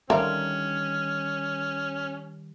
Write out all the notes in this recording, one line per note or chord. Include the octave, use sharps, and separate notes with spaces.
D3 D#3 G3 C#4 A#4 E5 F5